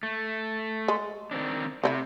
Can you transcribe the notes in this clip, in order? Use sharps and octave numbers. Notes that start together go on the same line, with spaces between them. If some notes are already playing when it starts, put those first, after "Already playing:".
A3
G#3
D#3 C4 D4
C3 A3 D#4 E4